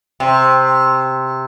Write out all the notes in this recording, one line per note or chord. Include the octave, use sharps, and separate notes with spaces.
C3